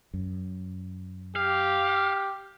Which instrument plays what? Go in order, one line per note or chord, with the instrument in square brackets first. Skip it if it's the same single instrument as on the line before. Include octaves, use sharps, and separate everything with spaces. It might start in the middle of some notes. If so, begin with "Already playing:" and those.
[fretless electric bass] F#2
[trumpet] G4 [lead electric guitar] F5